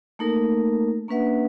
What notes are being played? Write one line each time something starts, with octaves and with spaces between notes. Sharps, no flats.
A3 A#3 D#4 A4 A#4
A#3 C#4 D4 B4 E5 F#5